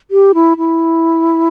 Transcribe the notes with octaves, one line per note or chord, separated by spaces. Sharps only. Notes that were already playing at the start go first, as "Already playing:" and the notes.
G4
E4
E4